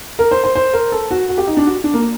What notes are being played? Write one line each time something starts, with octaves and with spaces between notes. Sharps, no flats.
A#4
C5
C5
C5
A#4
A4
F#4
F#4
G4
D#4
D4
F#4
D4
A#3